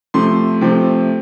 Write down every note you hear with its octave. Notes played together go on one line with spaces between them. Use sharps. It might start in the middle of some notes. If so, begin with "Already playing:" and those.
C3 F3 A3 C6
C3 F3 A3